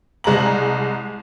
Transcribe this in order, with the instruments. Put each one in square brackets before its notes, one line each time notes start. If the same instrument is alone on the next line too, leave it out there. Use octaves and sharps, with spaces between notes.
[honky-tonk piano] C2 G#3 A5 A#5 F#7